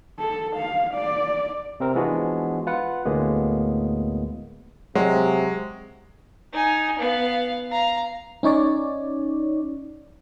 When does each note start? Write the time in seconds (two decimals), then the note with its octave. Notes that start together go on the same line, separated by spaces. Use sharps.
0.19 A4
0.56 F5
0.94 D5
1.80 C3 C4 A#4
1.95 E3 F3 G#3 B3 D4 F#4
2.67 F4 B4 F#5
3.05 D2 A2 G#3 A#3 B3
4.95 C3 F#3 G#3
6.53 D#4 G#5
6.99 B3 F5
7.70 F5 A#5
8.43 C#4 D#4 C#5 D5